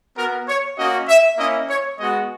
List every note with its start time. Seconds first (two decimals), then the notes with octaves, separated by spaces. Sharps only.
0.17 B3 F#4 A#4
0.48 C#5
0.77 A#3 C#4 F#4 D#5
1.08 E5
1.38 A#3 C#4 E4 D#5
1.69 C#5
1.99 G#3 B3 F#4 D#5